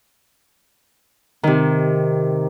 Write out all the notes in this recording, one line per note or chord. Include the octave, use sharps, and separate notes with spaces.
C3 D#3